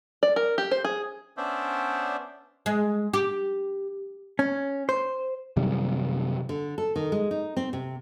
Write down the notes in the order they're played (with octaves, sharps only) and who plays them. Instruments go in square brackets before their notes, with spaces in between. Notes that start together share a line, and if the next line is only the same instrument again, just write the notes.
[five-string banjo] D5
A#4
G4
C5
G#4
[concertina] B3 C#4 D4 C5 D5 E5
[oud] G#3
G4
[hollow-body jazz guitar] C#4
C5
[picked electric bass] F#2 C3 D#3 G3
[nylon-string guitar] D3
A4
D#3
G#3
D#4
C4
C3